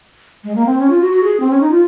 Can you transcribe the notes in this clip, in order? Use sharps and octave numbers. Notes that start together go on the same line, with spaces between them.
G#3
A#3
C4
C#4
F4
F#4
F#4
G#4
C4
C#4
D#4
F4